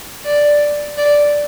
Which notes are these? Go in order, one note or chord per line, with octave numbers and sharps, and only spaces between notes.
D5
D5